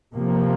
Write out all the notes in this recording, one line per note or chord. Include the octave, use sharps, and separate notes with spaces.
C3 F3 A#3